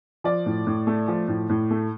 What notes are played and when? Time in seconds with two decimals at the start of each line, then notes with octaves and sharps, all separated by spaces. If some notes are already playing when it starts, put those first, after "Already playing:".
0.24 F3 D5
0.46 A2
0.67 A2
0.87 A3
1.08 F3
1.28 A2
1.49 A2
1.71 A3